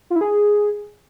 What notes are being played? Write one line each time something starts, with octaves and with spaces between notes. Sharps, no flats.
F4
E4
G#4